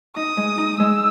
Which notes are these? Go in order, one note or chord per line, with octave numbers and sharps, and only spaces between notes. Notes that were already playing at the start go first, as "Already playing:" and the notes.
D#4 D#6
G#3
D#4
G#3 E6